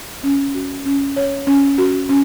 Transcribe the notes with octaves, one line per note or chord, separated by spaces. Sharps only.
C#4
F#4
C#4
C#5
C#4
F#4
C#4